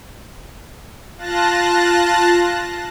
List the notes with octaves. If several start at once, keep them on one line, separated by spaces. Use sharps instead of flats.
F4 A5 F#6 A#6